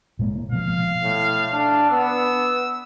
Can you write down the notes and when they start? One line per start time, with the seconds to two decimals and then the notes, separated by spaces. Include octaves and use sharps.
0.19 A#2 G#3 A#3
0.52 B2 F3 F5
1.03 A2
1.52 D4
1.91 B3 E6